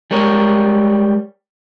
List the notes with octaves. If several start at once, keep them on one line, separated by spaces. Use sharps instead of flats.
G3 G#3 A#4 C#5